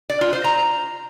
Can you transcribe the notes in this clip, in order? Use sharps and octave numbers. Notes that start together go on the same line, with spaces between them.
D5
F4
C5
A#5